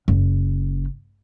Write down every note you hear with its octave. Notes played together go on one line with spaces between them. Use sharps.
F#1